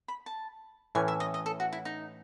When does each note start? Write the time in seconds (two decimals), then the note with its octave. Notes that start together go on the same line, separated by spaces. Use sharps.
0.08 B5
0.26 A5
0.95 A2 E3 A3 C#4 G#5
1.08 E5
1.20 D#5
1.34 D#5
1.46 A4
1.60 F#4
1.73 E4
1.85 D#4